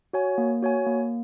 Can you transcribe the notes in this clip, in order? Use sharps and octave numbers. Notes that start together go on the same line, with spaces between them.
F#4 C#5 G#5
A#3
F#4 C#5 G#5
A#3